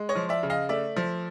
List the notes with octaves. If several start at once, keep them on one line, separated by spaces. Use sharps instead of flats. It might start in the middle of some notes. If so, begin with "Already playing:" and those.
Already playing: G#3
C#5 D#5
F3
D5 E5
C#3
D#5 F5
A3 D5 E5
F3